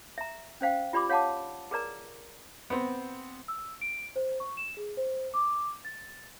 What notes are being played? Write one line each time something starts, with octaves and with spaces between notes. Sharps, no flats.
E5 A#5
C#4 C5 F5 G5
F4 G4 D5 B5 C6 D6
C#5 F5 F#5 A5 D6
G#4 A#4 B4 D5 A#5
B3 C4
E6
D7
C5
C#6
E7
G#4
C5
D6
A6